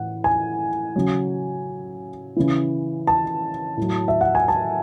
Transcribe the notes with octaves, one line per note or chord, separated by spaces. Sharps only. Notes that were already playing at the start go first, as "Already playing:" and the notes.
Already playing: A2 E3 F#5
G#5
C#3 F#3
C#3 E3
A5
A2 F#3
E5
F#5
G#5
A5